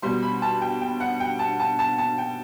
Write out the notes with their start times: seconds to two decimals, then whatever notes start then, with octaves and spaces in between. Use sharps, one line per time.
0.02 B2 G3 C6
0.22 B5
0.42 A5
0.61 G5
0.81 G5
1.00 F#5
1.20 G5
1.39 A5
1.60 A5
1.79 A5
1.98 A5
2.18 G5